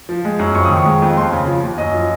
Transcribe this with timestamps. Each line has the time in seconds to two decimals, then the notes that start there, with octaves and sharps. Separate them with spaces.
0.09 F3
0.25 G#3
0.39 F#2
0.55 F2 C#6
0.65 D#3 D#6
0.77 C#6
0.85 G#3
1.02 F2
1.17 D#2 C6
1.33 C#3
1.48 F3
1.63 D#2
1.78 F#2 D#5
1.94 F3